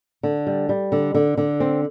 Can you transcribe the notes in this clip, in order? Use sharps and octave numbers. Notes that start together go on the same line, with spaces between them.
D3
G3
G3
D3
D3
D3
C4